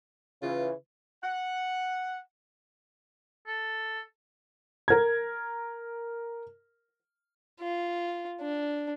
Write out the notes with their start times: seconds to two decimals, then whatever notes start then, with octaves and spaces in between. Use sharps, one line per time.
0.42 C#3 E3 F4
1.23 F#5
3.47 A4
4.88 A#4 G#6
7.60 F4
8.41 D4